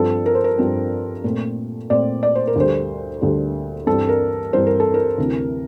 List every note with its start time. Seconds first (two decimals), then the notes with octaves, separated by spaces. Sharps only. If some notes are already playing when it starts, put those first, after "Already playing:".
Already playing: G2 F3 C4 A4
0.26 A#4
0.35 C5
0.44 A#4
0.58 G2 F3 C4
1.24 A#2 A3 C4
1.90 A#2 A3 C4 D5
2.23 D5
2.35 C5
2.47 A#4
2.56 D2 D3 G3 C5
3.21 D2 D3 G3
3.87 G2 E3 G3 C4 A4
4.09 A#4
4.53 G2 E3 G3 C4 C5
4.67 A#4
4.80 A4
4.94 A#4
5.18 D2 C3 E3